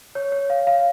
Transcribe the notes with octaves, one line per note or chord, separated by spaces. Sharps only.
C#5
C#5
F5
F5